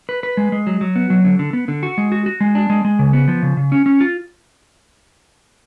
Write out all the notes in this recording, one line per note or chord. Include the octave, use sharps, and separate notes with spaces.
B4
B4
G#3
G#3
F#3
F#3
B3
F#3
D3
D3
B3
D3
F#4
G#3
F#4
F#4
G#3
D4
G#3
G#3
C#3
B3
F3
C#3
C#3
C#4
C#4
F4